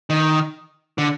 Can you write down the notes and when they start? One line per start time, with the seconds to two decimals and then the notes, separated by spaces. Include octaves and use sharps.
0.10 D#3
0.98 D3